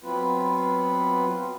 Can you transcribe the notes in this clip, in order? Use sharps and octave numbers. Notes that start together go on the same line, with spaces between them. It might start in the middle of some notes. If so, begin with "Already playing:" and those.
F#3 B3 C4 F4 B4